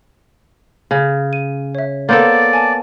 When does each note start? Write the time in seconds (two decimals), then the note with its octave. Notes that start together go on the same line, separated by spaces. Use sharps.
0.91 C#3
1.33 D#7
1.75 C#5 E5
2.09 A#3 B3 A4 C#5 D5 C6 G6
2.53 G#5 A5